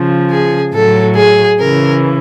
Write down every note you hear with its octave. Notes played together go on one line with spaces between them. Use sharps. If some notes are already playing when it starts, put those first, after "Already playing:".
Already playing: C#3 F3
G#4
A2 F#3 A4
G#4
C#3 E3 A#4